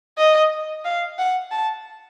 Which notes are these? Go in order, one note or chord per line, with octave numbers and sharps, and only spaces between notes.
D#5
F5
F#5
A5